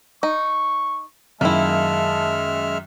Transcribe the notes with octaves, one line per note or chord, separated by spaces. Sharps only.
D#4 C#6
F#2 D#3 G#3 A#3 E4 E5 A5 F6